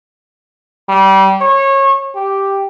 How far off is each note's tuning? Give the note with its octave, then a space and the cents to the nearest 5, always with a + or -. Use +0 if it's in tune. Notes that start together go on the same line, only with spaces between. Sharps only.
G3 -25
C#5 -25
G4 +0